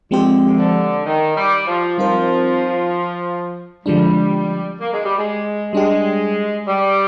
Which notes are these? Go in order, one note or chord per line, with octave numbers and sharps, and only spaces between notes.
D3 F3 G#3 C4 G4 C5
C3
D3
D#3
G3
F3
F3 G3 C4 D#4 A#4
D3 F3 G3 G#3 D4
A#3
G#3
G3
G#3
G3 G#3 D4 G4
G3